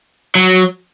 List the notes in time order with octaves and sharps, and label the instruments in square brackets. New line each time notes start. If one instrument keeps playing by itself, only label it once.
[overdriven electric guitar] F#3